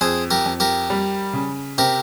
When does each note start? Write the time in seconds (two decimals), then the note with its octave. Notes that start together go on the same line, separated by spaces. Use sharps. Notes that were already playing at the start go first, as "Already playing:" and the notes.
0.01 F2 G#4 C5
0.31 G4 A#4
0.46 F2
0.60 G4 A#4
0.90 G3
1.33 C#3
1.78 C3 G4 A#4